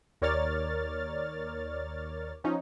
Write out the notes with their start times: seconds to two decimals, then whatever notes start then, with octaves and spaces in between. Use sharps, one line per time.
0.22 D#2 A#4 C#5 D5 F6 A6
2.44 F3 C#4 D#4